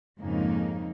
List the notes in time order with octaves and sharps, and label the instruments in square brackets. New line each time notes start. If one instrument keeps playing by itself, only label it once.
[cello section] F2 G#2 C#3 A#3 D#4